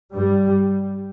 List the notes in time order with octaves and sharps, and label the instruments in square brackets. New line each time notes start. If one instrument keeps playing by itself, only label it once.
[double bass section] G2 G3